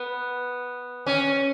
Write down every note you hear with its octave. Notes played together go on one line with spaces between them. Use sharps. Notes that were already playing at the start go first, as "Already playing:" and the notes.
Already playing: B3
C#4